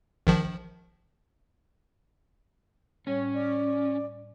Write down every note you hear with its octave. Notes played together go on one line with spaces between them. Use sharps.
A#1 D#3 F3
A2 G3 C#4 C#5
D5